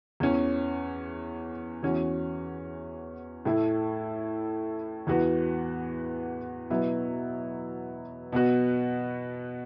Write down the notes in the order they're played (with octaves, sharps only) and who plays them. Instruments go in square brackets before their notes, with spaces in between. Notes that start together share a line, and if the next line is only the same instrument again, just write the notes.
[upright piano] E2 E3 C#4
E2 E3 C#4 F#4
A2 A3 E4
E2 E3 B3 F#4
B2 F#3 B3 E4
B2 B3 F#4